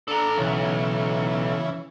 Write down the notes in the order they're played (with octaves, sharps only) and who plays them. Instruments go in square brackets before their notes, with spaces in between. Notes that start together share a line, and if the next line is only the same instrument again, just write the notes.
[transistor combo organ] D4 [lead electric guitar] A4 A#5
[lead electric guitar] B1 [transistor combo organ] C#3 E3